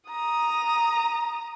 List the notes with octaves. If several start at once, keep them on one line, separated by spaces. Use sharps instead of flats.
A#5 D#6